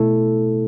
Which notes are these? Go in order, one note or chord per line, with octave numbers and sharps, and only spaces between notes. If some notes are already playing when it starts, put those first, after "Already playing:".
Already playing: B2 A3 E4 A4